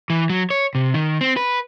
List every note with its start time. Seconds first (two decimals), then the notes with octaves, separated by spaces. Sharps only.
0.10 E3
0.30 F#3
0.50 C#5
0.75 C3
0.94 D#3
1.21 C4
1.37 B4